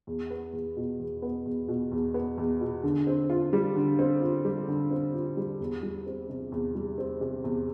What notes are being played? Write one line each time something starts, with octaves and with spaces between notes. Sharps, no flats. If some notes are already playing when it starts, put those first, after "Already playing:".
E2
B3
E2
B2
E2
B3
E2
B2
E2
B3
E2
B2
D3
C4
F4
G3
D3
C4
F4
G3
D3
C4
F4
G3
E2
G3
C4
C3
E2
G3
C4
C3
E2